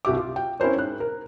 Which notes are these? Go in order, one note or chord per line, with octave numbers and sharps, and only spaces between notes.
C2 F#4 G4 E5 D6
F4
G5
C#4 E4 A#4 C5 C#5
G#2 F#6
A#4